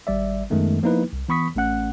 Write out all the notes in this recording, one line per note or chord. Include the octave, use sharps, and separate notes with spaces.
G#1 G3 D5 E5
F#2 D#3 G#3 A3 B3
F3 A#3 B3 D#4 E4 B4
C2
E3 B3 B5 C#6 D#6 B6
A1 A3 C#4 F#5 F#6